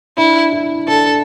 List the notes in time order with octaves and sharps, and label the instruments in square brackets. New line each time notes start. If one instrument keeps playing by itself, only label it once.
[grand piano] D4 [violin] E4
[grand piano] E4
[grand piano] D4 [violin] A4